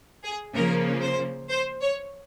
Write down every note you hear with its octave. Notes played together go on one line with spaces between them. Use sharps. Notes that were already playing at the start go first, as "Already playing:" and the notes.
G#4
C#3 F3 A#3 A#4
C5
C5
C#5